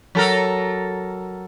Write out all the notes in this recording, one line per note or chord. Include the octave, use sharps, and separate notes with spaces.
F#3 A4 A#4